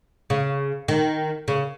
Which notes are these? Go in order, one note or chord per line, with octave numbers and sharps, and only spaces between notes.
C#3
D#3
C#3